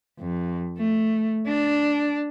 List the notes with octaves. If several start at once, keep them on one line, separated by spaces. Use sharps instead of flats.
F2
A3
D4